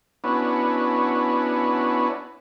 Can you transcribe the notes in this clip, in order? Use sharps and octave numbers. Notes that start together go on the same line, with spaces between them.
B3 C#4 D4 E4 F#4 B4